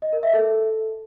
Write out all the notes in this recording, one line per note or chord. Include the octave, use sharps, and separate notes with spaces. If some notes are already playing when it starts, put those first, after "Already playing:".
D#5
A#4
E5
A4